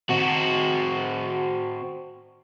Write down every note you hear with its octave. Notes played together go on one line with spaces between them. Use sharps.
C4 F#4